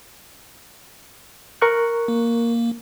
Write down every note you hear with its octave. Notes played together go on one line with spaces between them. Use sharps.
A#4 C#6 F#6
A#3